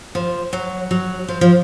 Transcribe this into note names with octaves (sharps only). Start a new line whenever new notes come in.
F3
F#3
F#3
F3
F3